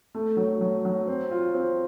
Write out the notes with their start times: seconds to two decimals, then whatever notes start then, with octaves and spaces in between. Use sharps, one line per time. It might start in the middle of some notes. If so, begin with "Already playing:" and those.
0.15 A3
0.37 F#3
0.61 F#3
0.85 F#3
1.07 C4
1.31 F4
1.54 C4